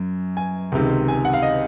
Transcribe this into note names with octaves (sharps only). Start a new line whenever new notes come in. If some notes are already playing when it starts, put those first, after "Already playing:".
Already playing: F#2
G#5
C#2 C3 D#3
G#5
F#5
F5
D#5